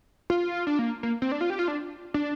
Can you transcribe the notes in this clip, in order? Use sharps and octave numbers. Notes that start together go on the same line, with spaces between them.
F4
D4
A#3
A#3
C4
D4
F4
G4
F4
D4
D4